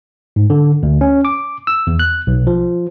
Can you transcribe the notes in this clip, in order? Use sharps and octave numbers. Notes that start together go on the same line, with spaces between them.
G#2
D3
D2
C#4
D6
E6
E2
F#6
B1
F3